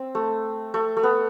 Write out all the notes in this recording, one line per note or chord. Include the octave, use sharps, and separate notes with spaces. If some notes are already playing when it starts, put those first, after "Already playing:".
Already playing: C4
A3
A3
A3
B3